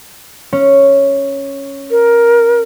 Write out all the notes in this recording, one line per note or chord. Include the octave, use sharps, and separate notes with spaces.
C#4
A#4